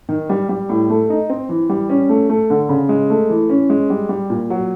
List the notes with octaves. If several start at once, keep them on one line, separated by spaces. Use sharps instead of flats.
D#3
G3
G3
A2
A3
D#4
C4
E3
G3
C#4
A3
A3
D3
C#3
G#3
A3
E3
C#4
G#3
G3
G3
A#2
F#3